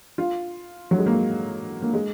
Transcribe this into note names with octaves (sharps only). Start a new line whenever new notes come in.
F4
F#3
G#3
A#3
A#3
G#3